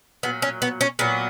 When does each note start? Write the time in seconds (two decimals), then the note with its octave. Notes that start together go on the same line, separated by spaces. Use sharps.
0.23 A#2 F#3 B3
0.42 C#4
0.62 B3
0.81 C#4
0.99 A#2 F#3 B3